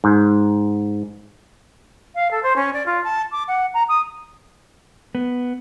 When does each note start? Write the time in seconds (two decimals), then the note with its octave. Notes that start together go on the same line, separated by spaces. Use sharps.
0.04 G#2
2.15 F5
2.31 A4
2.43 C5
2.56 C#4
2.73 D5
2.86 F4
3.04 A5
3.32 D6
3.48 F#5
3.74 A#5
3.89 D#6
5.15 B3